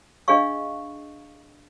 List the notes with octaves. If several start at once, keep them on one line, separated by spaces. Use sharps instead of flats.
D4 G#4 D#5 F5 C#6